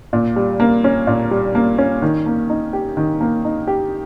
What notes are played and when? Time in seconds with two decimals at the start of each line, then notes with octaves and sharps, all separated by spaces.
0.13 A#2
0.36 G3
0.60 A#3
0.84 C#4
1.07 A#2
1.31 G3
1.55 A#3
1.78 C#4
2.02 D#3
2.26 A#3
2.50 D#4
2.73 G4
2.97 D#3
3.21 A#3
3.45 D#4
3.67 G4